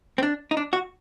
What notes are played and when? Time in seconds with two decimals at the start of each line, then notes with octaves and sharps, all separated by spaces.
0.18 C4
0.23 D4
0.51 D#4
0.57 D4
0.73 F#4